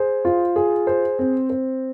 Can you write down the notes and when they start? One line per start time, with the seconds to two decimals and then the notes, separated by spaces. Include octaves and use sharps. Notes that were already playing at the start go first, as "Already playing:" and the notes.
Already playing: G#4 C5
0.25 F4
0.56 G#4
0.87 C5
1.19 C4
1.50 C5